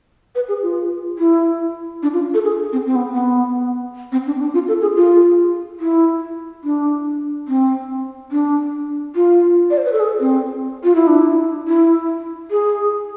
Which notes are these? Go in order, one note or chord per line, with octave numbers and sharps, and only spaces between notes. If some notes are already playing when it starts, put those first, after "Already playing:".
B4
G#4
F4
E4
D4
F4
A4
G#4
C4
C4
B3
B3
C4
D4
C4
D4
F4
A4
G#4
F4
E4
D4
C4
D4
F4
D5
C5
B4
A4
G#4
C4
F4
E4
D4
E4
E4
G#4